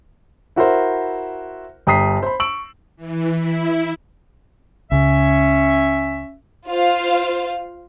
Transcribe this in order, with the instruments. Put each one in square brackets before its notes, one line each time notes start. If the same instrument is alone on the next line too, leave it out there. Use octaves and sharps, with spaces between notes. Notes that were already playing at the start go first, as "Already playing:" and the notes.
[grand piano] E4 F#4 A#4 C5 E5
G1 G5 A#5 D#6 B6 C7
C5 B5
C#6 E6 D7 F#7
[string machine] E3
E4
[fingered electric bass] C#2 C#3 [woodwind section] C#4 E5
[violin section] F4 C5 F5